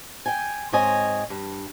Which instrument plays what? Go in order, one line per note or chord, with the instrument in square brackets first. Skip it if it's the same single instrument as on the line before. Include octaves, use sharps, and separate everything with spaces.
[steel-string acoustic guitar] G5 G#5
G#2 C4 C#5 D#5 G#5
G2